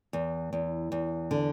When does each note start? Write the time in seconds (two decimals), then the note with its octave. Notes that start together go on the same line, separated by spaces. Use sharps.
0.13 E2
0.53 E2
0.92 E2
1.31 D3